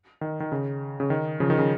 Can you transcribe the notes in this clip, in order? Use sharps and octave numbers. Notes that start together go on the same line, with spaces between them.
D#3
D#3
C#3
C#3
D#3
C#3 F3
D#3
C#3